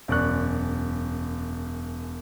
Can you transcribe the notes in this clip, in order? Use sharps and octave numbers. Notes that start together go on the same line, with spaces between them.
E1 F#2 D5 C#6 F#6